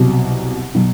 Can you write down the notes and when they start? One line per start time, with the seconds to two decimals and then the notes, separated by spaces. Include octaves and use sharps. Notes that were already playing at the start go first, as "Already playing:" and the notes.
Already playing: C2 B2 F#3
0.75 B2 F#3